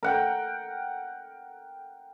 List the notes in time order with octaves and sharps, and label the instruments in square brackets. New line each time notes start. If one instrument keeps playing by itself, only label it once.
[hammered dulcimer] A#4 F#5 G5